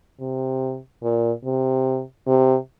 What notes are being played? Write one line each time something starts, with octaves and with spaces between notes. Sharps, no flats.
C3
A#2
C3
C3